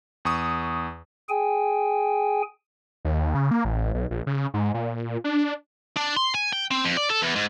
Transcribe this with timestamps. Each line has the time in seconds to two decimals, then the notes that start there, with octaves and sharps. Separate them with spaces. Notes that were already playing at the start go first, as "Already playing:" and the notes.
0.25 E2 C#6 D#6
1.29 G#4 G5 G#5
3.05 D#2
3.35 C#3
3.51 A#3
3.65 A1
3.94 B1
4.11 A#1
4.27 C#3
4.54 G#2
4.74 A#2
5.24 D4
5.96 D4
6.17 C6
6.35 G#5
6.53 G5
6.71 C4
6.85 F2
6.97 D5
7.10 A4
7.22 E2
7.36 G#2